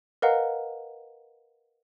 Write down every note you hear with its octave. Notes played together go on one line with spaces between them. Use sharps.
A#4 B4 D#5 F5 F#5 A#5